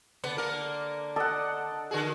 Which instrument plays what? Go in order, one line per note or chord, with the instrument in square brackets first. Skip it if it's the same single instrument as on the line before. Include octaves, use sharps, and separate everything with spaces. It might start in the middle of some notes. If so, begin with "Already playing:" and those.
[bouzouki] D3 [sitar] B3
[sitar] A#3 A#4
[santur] A4 D5 A5 [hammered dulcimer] D#5 F#5
[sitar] D3 F#4 G#4